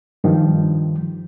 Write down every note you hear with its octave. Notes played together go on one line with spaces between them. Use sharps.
G2 D#3 F3